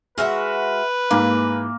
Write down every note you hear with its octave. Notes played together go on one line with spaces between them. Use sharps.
G#3 F#4 B4 E5 F6
G#2 E3 A#3